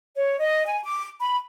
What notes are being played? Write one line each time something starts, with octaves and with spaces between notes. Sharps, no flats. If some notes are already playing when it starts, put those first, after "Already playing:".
C#5
D#5
G#5
D6
B5